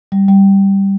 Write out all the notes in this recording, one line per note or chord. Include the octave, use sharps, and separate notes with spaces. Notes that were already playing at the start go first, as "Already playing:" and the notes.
G3
G3